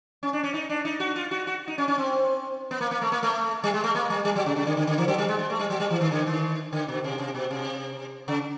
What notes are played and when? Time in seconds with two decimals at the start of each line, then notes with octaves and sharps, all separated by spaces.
0.23 C#4
0.33 D4
0.43 C#4
0.54 D#4
0.69 D4
0.85 D#4
1.00 F#4
1.16 F4
1.31 F#4
1.47 F#4
1.68 D#4
1.78 C#4
1.88 C#4
1.98 C4
2.71 B3
2.81 A#3
2.91 A#3
3.02 A3
3.12 A#3
3.23 A3
3.64 G3
3.74 G#3
3.84 A3
3.95 A#3
4.10 G3
4.25 G3
4.36 F#3
4.46 C#3
4.56 C#3
4.67 D3
4.77 D3
4.87 D3
4.98 E3
5.08 F#3
5.18 G3
5.28 G#3
5.39 G#3
5.50 A3
5.59 G3
5.70 F#3
5.80 G3
5.90 E3
6.01 D#3
6.12 D3
6.26 D#3
6.73 D3
6.88 B2
7.04 C3
7.19 C3
7.35 B2
7.51 C3
8.28 C#3